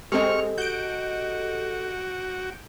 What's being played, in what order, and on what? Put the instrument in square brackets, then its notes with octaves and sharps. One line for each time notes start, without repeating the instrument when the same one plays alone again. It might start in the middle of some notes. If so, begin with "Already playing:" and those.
[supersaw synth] G#3 C4 [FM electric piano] G4 A4 D#5 [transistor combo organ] C#6 F6
[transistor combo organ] F#4 [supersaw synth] G6 D7